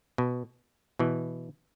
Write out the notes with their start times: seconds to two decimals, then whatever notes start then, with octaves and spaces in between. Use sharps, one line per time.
0.18 B2
0.99 B2 E3